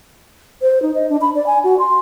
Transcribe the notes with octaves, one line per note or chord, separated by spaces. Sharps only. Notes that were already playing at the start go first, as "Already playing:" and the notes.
C5
D#4
D#5
D4
B5
D5
G#5
F#4
C6